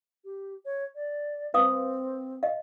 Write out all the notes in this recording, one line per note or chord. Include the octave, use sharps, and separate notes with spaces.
G4
C#5
D5
C4 B4 F5 D#6
D#5 F5